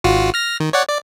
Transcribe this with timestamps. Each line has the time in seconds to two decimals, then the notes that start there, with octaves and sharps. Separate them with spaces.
0.04 G#1 F4 F#4
0.34 F6 A#6
0.60 D#3
0.73 C#5 D5 F#5
0.88 D5